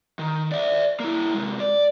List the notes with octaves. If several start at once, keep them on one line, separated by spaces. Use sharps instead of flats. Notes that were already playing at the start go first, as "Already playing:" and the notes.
D#3
D5 E5
A#3 E4
C3 G#3
D5